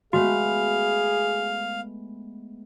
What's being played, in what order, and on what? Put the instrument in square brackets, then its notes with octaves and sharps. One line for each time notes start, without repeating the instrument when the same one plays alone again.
[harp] G#3 A3 B3 [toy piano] F#4 [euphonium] G#4 [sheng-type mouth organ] F5